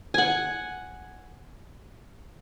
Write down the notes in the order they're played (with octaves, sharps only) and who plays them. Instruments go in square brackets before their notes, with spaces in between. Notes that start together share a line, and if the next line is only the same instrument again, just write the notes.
[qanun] F#5 G#5